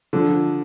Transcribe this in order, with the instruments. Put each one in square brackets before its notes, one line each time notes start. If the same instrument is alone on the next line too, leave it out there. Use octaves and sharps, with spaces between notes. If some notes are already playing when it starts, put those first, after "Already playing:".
[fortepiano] D3 [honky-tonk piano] F3